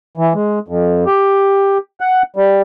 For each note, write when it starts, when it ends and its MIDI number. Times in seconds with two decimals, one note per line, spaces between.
0.18 0.33 52
0.35 0.59 56
0.68 1.04 41
1.06 1.78 67
2.01 2.22 78
2.36 2.62 55